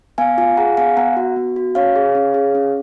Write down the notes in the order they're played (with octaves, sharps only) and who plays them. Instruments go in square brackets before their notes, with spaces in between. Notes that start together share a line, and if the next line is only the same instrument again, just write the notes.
[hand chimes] B3 F5 G#5
F4 F5 G#5
G#4 F#5 A#5
B3 F5 G#5
B3 F#5 A#5
F#4
B3
F#4
C#4 C#5 F5
G#4
C#4
G#4
C#4